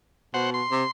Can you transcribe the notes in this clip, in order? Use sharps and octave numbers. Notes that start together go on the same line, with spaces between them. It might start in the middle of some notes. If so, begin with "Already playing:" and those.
B2 C5 F#5
C6
C3